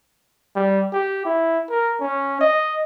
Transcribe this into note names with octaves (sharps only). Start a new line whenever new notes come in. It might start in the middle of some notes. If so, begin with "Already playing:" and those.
G3
G4
E4
A#4
C#4
D#5